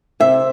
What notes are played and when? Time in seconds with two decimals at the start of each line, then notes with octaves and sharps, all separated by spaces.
0.20 C3 C5 E5